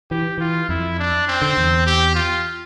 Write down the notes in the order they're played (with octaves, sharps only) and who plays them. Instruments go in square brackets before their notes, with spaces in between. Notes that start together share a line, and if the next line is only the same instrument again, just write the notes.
[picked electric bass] E3 [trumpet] G4
[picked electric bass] E3 [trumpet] F4
[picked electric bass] F2 [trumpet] E4
[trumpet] D4
C4
[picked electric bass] D3
E2
[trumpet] G4
F4